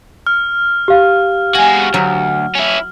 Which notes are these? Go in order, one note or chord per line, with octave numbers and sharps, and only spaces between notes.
F6
G4 F5
G#3 F#4 G#5
D2 F#3
C#4 E4